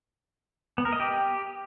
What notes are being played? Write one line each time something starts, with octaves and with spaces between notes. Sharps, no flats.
B3
A#4
D#5
G4